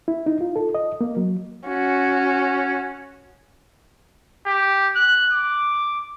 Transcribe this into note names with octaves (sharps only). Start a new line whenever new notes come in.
E4
D#4
F4
A4
D#5
A#3
F#3
C#4 F#4
G4
F#6
D6